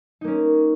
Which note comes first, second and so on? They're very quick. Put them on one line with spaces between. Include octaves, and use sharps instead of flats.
D#4 A#3 C#4